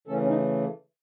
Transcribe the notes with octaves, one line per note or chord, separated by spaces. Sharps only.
C#3 E3 A3 C#4 A4
C#4
D#4